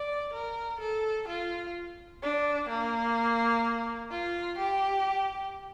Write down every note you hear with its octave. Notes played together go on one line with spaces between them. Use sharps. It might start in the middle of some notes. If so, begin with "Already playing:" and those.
Already playing: D5
A#4
A4
F4
D4
A#3
F4
G4